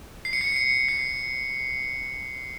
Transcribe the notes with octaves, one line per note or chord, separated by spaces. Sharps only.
C7
C#7
C7
C#7
C7